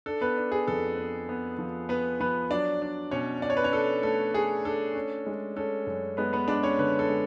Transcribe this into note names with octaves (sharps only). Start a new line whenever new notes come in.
D4 A4
B3 B4
D4
G#4
F2 A4
B3
B3
F3
B3 B4
F3 B3 B4
F#3 D4 D5
D4
B2 C#4 C#5
D4 D5
C#5
B4
C#4 C#5
D4 A4
A3 A4
A3 G#4
D4 A4
C#4
G#3
C#4 A4
F#2
G#3 B3 B4
B3 B4
G#3 D4 D5
C#4 C#5
D3 B3 B4
A4
G#3